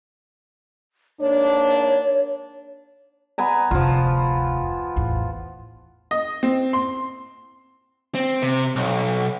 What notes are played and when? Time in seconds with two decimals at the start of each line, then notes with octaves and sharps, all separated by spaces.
1.21 G#2 A#3 D4 C#5
3.38 B3 G#5 A#5
3.71 F1 D2 F3 F4
4.96 A1 E2
6.11 D#5
6.43 C4
6.73 C6
8.15 C4
8.42 C3
8.76 B1